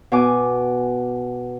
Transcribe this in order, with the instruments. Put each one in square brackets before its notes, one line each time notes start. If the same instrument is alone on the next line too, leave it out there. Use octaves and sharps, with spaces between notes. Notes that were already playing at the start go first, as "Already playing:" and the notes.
[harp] B2 G#5 D6